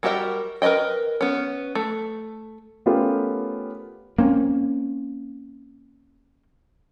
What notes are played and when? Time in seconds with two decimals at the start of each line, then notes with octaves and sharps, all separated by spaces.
0.03 G3 F#4 G4 A#4 E5
0.62 A#4 B4 D5 D#5 G5
1.21 B3 C#4
1.75 A3
2.86 A3 B3 C#4 F4 G4 A#4
4.18 A#3 C4 C#4